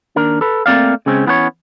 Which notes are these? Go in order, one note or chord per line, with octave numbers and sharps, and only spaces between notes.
D#2 D4 A#4
A4 B4
A3 A#3 C4 D5 F5
C#3 G#3 C4 C#4
E3 B3 C#4 B4 C#5